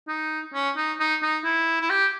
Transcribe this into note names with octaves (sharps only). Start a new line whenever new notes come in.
D#4
C#4
D#4
D#4
D#4
E4
E4
G4